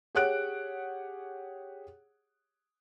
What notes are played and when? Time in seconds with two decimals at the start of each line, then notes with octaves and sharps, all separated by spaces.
0.15 G4 G#4 C#5 F#5 F#6 D7